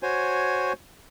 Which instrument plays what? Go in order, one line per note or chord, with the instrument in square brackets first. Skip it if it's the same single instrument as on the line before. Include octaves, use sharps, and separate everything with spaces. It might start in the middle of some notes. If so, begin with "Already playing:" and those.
[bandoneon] F#4 C5 C#5 G#5